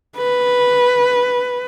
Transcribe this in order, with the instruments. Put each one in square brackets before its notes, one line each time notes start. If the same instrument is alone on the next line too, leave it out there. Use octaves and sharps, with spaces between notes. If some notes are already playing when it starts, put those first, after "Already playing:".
[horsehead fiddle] B4